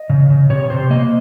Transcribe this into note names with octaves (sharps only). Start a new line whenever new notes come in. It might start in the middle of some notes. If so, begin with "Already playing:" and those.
Already playing: D#5
C#3
C#3
C3 C#5
C3 C5
A#3 D#5